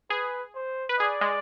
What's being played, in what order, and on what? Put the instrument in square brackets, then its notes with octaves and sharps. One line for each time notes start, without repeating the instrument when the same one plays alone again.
[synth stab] G#4 [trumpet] B4
[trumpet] C5
[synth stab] B4
[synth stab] G#4 [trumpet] D5
[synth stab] G#3